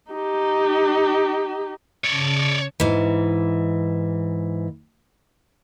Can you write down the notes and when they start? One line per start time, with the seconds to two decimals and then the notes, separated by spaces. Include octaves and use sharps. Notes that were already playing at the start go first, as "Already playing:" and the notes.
0.11 D#4 G4
2.05 C#3 C#5 D5 A5 C#7
2.80 G#2 E3